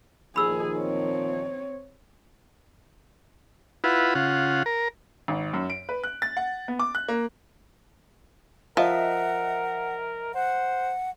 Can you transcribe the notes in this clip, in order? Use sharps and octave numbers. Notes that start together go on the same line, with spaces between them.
A#2 D#3 F3 G#4 B5 E6
C4 C#5
E4 F4 B4 F#5
C#3 F4 F#5
A#4
G#1
F#2
D7
B4
F#6
A6
F#5
B3
D6
F#6
A#3
F3 A#4 D#5 E5 F#5
C5 F#5